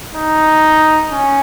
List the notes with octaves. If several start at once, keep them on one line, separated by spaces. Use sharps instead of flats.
D#4
C#4